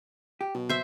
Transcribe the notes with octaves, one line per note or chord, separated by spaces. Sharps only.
G4
B1 B2
C5 E5